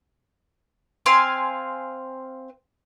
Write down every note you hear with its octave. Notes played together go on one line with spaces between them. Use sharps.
C4 F5 G#5 C6